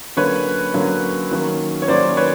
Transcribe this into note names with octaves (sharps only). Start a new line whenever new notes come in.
D3 F#3 A#3 C#4 B4 C#5
D3 F#3 A#3 C#4
D#3 F#3 A#3 C#4
C#5
D#3 F#3 A#3 C#4 C5 D5
B4 C#5